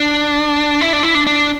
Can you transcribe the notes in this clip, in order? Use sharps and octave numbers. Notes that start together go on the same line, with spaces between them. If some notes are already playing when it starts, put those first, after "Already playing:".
Already playing: D4
E4
D4
E4
D4
D4